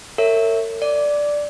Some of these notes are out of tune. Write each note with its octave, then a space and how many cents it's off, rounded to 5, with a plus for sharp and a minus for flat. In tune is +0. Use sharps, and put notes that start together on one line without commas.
A#4 -45 C#5 +0 E5 +0
D5 +0 D6 -10